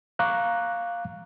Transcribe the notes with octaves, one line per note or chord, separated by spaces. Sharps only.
F5 A#5 C#6 D6 F#6